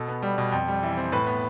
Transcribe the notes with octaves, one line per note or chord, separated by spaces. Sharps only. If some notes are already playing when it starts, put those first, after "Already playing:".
Already playing: B2 A4
B3
G3
B2
F2
G3
E3
C4
A2 B4
B3